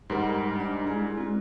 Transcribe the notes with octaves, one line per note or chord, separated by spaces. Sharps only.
G#2 G3 A#4 F#5
D4 D5
G#3 E4 G#4
C4 F#4